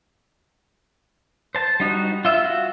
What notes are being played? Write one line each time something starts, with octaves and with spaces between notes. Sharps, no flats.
C5 A5
G3 D#4 F#4
F4 E5
F#4